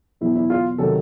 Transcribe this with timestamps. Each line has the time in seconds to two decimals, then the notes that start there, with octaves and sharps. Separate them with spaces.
0.21 E2 B2 F#3 E4
0.35 E4
0.50 F4
0.78 C3 D#3 F#3 A4